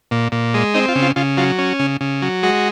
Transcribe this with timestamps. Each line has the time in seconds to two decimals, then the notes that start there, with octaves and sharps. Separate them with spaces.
0.11 A#2
0.32 A#2
0.54 G#3
0.74 C4 D#4
0.88 F4
0.95 C#3
1.02 F4
1.16 C#3 F4
1.37 F#3 F4
1.59 C#4
1.79 C#3
2.01 C#3
2.22 F#3
2.43 G#3 F#4